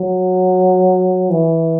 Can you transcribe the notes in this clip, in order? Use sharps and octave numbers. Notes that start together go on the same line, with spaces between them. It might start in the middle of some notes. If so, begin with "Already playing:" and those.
Already playing: F#3
E3